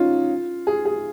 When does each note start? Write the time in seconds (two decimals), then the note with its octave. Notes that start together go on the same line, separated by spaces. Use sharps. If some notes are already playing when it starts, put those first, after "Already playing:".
Already playing: C#4 D#4 F4
0.67 G#4
0.85 G#4